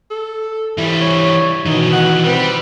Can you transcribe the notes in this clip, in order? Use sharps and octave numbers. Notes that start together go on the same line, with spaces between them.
A4
E3 G3 E4
C#5
B2 D#3 E3 D#4
F#5
G3 C4 B4